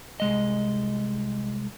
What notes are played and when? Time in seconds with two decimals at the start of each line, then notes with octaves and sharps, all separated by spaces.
0.20 C2 G#3 D#5